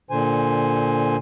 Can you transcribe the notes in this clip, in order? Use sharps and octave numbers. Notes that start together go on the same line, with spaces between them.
A#2 D3 C5 G#5